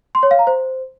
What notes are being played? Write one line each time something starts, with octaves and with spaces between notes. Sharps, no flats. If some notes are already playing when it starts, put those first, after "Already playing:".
C6
C#5
F5
A#5
C5